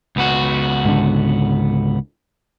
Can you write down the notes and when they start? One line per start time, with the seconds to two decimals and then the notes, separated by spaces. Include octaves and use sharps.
0.16 C#2 B3 F#4
0.85 G#2 D3